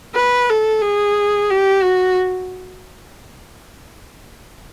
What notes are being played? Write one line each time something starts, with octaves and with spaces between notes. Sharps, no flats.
B4
A4
G#4
G4
F#4